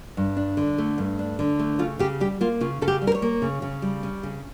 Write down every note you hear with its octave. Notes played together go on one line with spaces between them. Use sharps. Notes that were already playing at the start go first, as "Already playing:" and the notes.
G2
D4
D3
A3
G2
D4
D3
A3
C#3 F4
C#3 G4
G3 G4
A#3 F4
C#3 F4
C#3 A4
G4
G3
A#4
C#5
A#3
C#3
C#3
G3
C#4
C#3